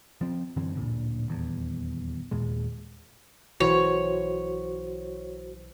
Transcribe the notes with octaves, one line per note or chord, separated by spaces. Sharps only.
F3 C4
F#2 D3 E3 C4
D1 A#2 D3
D#1 E2
D#2 A#2 G#3
B1 E3 F#4 C5 C#5